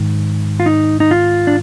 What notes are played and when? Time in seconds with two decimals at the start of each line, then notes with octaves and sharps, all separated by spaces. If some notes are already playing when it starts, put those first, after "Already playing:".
Already playing: G#2 D#3
0.60 F4
0.66 D#4
1.00 D#4
1.11 F4
1.47 D4